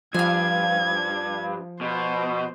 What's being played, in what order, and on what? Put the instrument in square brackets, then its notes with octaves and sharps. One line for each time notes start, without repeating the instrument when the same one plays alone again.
[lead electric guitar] G2 [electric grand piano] F3 [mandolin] F5 G#5 [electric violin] G#6
[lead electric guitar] B2 [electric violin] C5